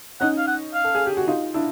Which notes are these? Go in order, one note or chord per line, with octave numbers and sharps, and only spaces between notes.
C#4 D#4 F#5
F5
F#5
F5
A4
G#4
G4
F#4
D#4 F4
D4 E4